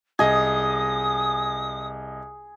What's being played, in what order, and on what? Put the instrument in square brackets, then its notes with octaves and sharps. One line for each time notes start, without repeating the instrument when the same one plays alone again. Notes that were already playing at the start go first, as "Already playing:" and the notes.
[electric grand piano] C2 D#5 G#6 [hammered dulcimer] G#4 [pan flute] D#6